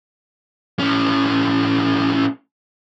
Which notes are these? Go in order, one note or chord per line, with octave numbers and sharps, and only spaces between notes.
A2 C#4